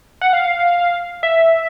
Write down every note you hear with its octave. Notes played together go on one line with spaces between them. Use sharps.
F#5
F5
E5